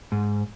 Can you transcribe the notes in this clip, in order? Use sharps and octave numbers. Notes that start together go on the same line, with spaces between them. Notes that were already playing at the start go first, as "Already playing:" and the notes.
G#2